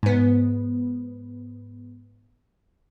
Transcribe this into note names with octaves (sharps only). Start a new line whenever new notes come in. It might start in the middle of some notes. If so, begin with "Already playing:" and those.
G#2 B3